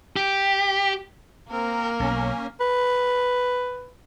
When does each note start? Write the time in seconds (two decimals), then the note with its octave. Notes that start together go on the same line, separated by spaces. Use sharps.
0.16 G4
1.51 A#3 C4 A#4
2.00 B1 C#4
2.60 B4